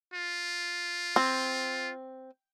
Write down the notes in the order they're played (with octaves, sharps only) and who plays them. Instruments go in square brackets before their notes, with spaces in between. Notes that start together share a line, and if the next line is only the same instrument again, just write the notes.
[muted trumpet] F4
[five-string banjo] C4